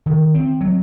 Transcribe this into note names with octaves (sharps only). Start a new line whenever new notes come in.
D#3
C4
F#3